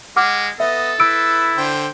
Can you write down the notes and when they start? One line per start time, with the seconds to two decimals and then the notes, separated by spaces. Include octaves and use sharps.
0.16 G#3 F#5 D6 F6
0.60 B3 A4 D#5 E5
1.00 E4 B4 E6 D7
1.57 D3 C5 G5